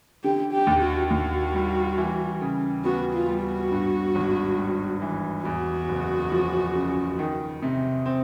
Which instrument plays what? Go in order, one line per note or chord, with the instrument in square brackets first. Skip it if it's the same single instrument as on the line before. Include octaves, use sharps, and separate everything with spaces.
[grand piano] D3 [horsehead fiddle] G4
[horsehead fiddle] G4
[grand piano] D#2
[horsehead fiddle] F#4
[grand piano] D#2 [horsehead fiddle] F#4
[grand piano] G3
E3
C#3
[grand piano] B3 [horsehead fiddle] F#4
[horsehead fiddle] F4
[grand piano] G3
[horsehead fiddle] F#4
[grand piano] G2
G#1
G3
E3
[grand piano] E2 [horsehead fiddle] F#4
[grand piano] F#1
F3
C#3
D#3
C3
C4